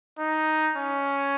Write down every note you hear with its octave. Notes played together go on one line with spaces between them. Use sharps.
D#4
C#4